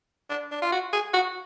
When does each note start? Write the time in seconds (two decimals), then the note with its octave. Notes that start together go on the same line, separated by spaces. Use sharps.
0.30 D4
0.51 D4
0.62 F4
0.72 F#4
0.93 G#4
1.13 F#4